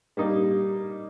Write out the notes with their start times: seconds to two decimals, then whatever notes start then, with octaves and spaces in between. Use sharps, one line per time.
0.17 G3 A#3 D#4